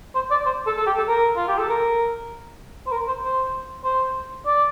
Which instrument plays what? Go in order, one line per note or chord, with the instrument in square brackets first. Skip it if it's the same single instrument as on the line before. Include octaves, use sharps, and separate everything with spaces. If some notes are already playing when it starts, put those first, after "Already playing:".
[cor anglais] C5
D5
C5
A4
A4
G4
A4
A#4
F4
G4
A4
A#4
C5
A#4
C5
C5
C5
D5